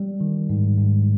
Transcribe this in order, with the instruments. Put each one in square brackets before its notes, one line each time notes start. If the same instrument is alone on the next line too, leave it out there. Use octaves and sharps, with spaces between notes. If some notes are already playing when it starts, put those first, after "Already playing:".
Already playing: [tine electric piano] G3
D#3
G#2
G#2